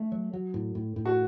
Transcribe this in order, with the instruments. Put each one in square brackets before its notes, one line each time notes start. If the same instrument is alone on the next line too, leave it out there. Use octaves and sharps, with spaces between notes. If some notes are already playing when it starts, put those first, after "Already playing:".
Already playing: [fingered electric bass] A3
F#3
F#3
A2
A2
A2
[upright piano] F#4